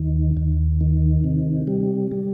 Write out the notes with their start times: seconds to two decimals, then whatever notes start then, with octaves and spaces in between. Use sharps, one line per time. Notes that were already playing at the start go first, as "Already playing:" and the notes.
Already playing: D#2 D#3
0.37 D#2
0.81 D#3
1.24 C3
1.67 G3
2.11 G3